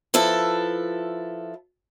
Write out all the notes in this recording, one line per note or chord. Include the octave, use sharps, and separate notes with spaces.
F3 E4 A4 B4